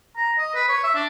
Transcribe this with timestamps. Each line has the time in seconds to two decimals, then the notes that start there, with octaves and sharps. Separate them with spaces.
0.17 A#5
0.39 D#5
0.54 B4
0.69 C#5
0.83 E5
0.95 D4